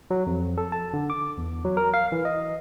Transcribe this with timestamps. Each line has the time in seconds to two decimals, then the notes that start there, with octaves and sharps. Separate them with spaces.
0.11 F#3
0.27 F2
0.58 A4
0.72 A5
0.94 D3
1.10 D6
1.38 E2
1.65 F#3
1.77 A#4
1.94 F5
2.12 E3
2.25 D#5